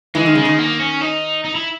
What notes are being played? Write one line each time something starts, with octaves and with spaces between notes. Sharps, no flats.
E3 G#3
D#3
C#3 G#3
D#3
A#3
C#4
D#4
D#4
E4